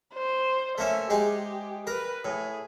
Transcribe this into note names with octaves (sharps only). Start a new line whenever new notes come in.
C5
A3 A#3 C#4 E5
G#3 D#4 G4
A#4 B4
A2 G#4